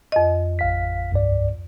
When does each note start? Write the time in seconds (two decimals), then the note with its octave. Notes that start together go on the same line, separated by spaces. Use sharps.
0.12 F2 D#5
0.59 A1 F5 B6
1.12 C2 G2 D5